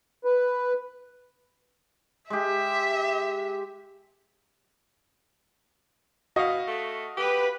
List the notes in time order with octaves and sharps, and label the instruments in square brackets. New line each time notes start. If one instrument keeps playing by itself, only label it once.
[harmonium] B4
[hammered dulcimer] G#3 G4 [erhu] E5
[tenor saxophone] B2 [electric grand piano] F#4 F5 [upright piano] D#5
[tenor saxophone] A3
[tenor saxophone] G4 [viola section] B4